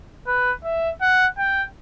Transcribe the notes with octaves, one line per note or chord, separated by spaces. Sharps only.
B4
E5
F#5
G5